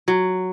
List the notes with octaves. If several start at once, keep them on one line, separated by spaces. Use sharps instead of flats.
F#3